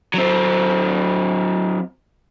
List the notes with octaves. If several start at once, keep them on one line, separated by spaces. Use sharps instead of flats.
F#3 C4